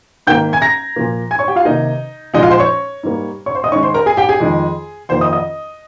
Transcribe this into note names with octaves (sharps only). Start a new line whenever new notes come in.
G#2 D#3 A#3 G5 G6
G#5 G#6
A#5 A#6
A#2 F3 A#3
G#5 G#6
C#5 C#6
G4 G5
F4 F5
C3 D#3 A#3 D#4 D#5
A#2 F3 G#3 D#4 D#5
F4 F5
C5 C6
C#5 C#6
G#2 G3 A#3
C#5 C#6
C5 C6
D#5 D#6
G#2 D#3 G#3 C#5 C#6
C5 C6
A#4 A#5
G#4 G#5
G4 G5
G#4 G#5
F2 D#3 G#3
F2 D#3 A#3 C5 C6
D#5 D#6
D#5 D#6